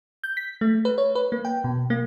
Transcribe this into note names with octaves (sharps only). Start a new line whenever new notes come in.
G6
B6
A3
B4
C#5
B4
A#3
G5
B2
A#3